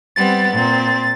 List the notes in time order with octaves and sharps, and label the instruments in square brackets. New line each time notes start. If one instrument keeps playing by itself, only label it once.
[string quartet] G3 B3 C4 [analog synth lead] A6
[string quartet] A#2 C4